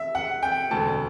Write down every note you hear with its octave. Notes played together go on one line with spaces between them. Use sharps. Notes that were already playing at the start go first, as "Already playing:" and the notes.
Already playing: E5
F#5
G5
E1 D2 D3 A5